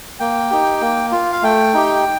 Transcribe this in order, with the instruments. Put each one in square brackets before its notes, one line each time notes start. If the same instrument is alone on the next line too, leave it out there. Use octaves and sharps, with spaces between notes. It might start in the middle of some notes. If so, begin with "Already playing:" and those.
[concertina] A#3 G5
D#4 G4
A#3
F4
F5
A3 G5
D#4 G4